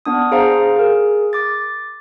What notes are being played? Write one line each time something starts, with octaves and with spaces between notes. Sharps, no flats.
B3 D4 D#6
G#4 C5 F5 A#5
G#4 A#4
D6 A6